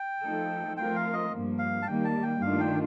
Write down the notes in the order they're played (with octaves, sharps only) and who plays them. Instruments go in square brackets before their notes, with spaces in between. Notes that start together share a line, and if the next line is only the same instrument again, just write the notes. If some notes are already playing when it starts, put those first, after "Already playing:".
Already playing: [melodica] G5
[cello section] F3 A3 D#4 A4
[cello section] F3 A3 C4 F4 A#4 [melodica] G5
[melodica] F5
D#5
[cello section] G2 F3 A#3
[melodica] F5
A5
[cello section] D#3 G3 A#3 [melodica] G5
[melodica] A5
G5
[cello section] G2 D#3 A3 D4 F4 [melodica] F5
[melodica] G5